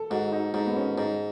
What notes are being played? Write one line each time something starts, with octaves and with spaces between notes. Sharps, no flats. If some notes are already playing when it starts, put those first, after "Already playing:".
Already playing: A4
G#2 F#4
D#4
G#2 D#4
B3
C#4
G#2 D#4